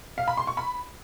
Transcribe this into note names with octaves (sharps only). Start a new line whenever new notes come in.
F5
B5
C6
C#6
B5